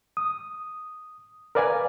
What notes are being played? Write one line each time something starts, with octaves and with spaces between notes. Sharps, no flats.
D#6
A#4 B4 D5 F5 G#5